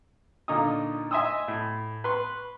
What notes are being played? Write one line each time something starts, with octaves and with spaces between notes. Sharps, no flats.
A#2 D3 D#4 C#6 D#6
D#5 E5 G#5 C6 D#6 E6
A2
B4 C6 C#6